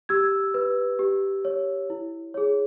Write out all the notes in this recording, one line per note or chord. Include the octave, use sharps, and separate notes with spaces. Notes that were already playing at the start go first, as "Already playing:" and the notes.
G4 E6 G#6
B4
G4
C#5
E4
G#4 C#5